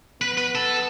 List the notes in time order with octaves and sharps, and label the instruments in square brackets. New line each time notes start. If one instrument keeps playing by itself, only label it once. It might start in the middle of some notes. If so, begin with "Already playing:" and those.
[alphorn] B3 [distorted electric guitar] B4
[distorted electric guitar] B4
A4